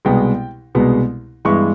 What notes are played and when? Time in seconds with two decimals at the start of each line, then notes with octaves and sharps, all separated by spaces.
0.05 C2 B2 G#3 B3 G5
0.75 C2 B2 G#3 B3
1.45 G2 E3 G#3 B3 C#6